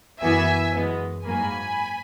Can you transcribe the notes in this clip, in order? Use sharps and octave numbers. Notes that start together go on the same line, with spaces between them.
F#2 E3 B3 E5 G#5
F#2 E3 G#3 B3
G#2 F#3 A#3 G#5 B5